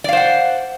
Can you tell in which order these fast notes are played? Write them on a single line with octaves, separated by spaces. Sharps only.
D5 F5 C5 F#5